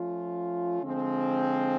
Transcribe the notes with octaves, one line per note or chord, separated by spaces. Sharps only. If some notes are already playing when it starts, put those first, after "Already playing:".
Already playing: F3 A3 C#4 F4
D3 F3 G#3 C4